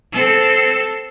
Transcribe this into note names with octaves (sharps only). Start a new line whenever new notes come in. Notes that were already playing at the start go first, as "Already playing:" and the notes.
C4 A4